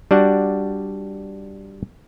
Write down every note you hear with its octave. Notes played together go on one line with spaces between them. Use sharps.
G3 D4 F#4 F#5